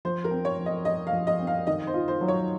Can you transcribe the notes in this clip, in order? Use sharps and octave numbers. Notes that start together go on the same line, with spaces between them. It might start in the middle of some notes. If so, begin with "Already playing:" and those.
F3 C5
A#4
C4
C#5
F3
D#5
F3 D#5
F5
F3
D#5
C4
F5
D#3 D#5
C5
F4
C5
F#3
C#5